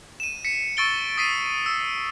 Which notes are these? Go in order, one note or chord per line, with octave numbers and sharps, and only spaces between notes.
D#7 E7
B6 C#7
C#6 E6 A6 D7 G7
D#6 A6 B6 C7 D#7
E6